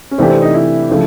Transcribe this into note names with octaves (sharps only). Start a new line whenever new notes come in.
C#4
C3 E3 A3 C4 D4 G4
C4
D#4
E4
C#3 F3 A3